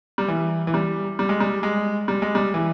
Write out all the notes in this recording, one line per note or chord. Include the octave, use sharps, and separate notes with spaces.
G3
E3
E3
G3
G3
G#3
G3
G#3
G3
G#3
G3
E3